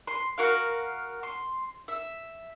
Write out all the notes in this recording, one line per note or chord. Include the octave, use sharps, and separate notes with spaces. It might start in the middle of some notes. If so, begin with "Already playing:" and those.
C6
F#4 A#4 F5
C6
E5